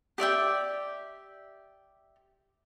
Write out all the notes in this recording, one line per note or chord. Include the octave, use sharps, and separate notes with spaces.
G4 D5 E5 G5